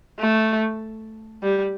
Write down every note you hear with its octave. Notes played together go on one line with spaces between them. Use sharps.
A3
G3